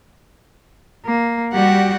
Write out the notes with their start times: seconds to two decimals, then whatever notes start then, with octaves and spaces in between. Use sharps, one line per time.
1.06 A#3
1.54 G3 F#4 G4 F#5